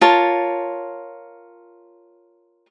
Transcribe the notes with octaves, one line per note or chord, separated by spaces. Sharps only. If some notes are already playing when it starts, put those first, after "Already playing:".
F4 A#4 C#5 A5